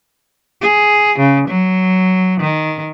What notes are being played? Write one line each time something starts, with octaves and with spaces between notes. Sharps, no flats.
G#4
C#3
F#3
D#3